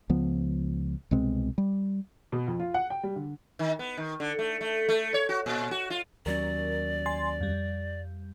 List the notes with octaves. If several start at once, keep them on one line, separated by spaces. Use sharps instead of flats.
C#2 F3 B3
C2 B2 G#3 C4
G3
B2
F2
F4
F#5
G5
G3
D3
D#3
B3
D#3
D3
A3
A3
A3
C#5
F#4
A#2
F#4
F4
D#2 F#3 C#4 A#4 D5
G#5 C6 A6
F2 G3